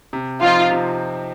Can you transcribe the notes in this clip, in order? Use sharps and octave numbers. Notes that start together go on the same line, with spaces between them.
C3
F3 C4 D#4 F4
C3